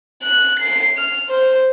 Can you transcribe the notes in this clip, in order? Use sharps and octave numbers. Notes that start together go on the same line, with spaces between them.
F#6
C7
F6
C5